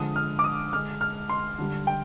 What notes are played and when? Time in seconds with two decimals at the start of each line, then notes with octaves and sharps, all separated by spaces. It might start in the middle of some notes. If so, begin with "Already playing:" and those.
Already playing: D3 F3 G#3 D#6
0.16 F6
0.39 D6
0.44 D#6
0.73 D3 G#3 F6
1.01 F6
1.29 C6
1.59 D3 G3
1.87 G5